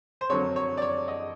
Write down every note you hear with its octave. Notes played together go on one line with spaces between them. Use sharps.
C5
F2 D3 F#3 A#3 C#5
C#5
D5
C#5
D#5